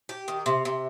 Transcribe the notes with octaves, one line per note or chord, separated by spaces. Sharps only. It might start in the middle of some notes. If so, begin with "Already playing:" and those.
G4
D#3
C3
C3